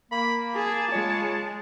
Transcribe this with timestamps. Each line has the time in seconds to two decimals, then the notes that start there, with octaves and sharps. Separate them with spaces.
0.11 A#3 B5
0.55 G#4 A5
0.92 C#3 G#3 F4 C#5